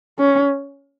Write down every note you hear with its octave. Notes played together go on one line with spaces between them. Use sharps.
C#4